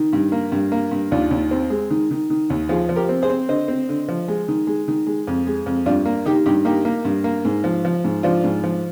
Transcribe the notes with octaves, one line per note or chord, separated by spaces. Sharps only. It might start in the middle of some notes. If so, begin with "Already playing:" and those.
Already playing: D#3
G2
A#3
G2
A#3
G2
D#2 D4 F4
D#2
C4
G#3
D#3
D#3
D#3
D#2
F3 F4 G#4
F3
G4 A#4
C4
G#4 C5
C4
D3 C5 D#5
C4
D3
F3
G#3
D#3
G#3
D#3
G#3
F2
G#3
F2
G2 D4 F4
A#3
D#3 D#4 G4
G2 D#4 G4
A#3 D#4 G4
A#3
G2
A#3
G#2
F3
F3
G#2
F3 D4 F4
G#2
F3